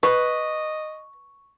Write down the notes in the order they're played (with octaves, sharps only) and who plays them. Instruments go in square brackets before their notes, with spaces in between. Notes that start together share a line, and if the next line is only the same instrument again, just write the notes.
[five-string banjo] B4 [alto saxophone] D#5 [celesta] C#6